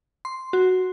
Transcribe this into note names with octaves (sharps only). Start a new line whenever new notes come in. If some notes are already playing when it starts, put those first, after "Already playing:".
C6
F#4